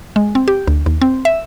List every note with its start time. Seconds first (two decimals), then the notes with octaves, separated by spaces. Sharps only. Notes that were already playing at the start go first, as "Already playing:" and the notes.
0.16 G#3
0.35 C4
0.48 G4
0.67 D2
0.86 D#2
1.02 C4
1.25 E5